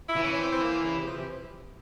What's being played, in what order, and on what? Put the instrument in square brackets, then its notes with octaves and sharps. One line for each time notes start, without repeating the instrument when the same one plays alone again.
[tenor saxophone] E4
[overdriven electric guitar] E3
[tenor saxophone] C#4
C#4
C4
C4
A#3
C#3
C3
F3
C3